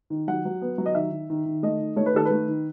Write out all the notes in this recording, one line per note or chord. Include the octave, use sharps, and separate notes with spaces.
D#3
F#3 F#5
F#3
B3
F#3
D#5
D#3 E5
D#3
D#3
D#3
A3 D#5
D#3
A3 C#5
B4
D#3 A4
B4
A3
D#3